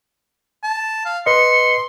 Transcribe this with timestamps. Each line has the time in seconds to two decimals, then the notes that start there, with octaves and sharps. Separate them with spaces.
0.64 A5
1.06 F5
1.26 B4 D#5 C6 C#7